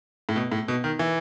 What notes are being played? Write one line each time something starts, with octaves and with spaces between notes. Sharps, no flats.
A2
B2
A2
B2
D#3
E3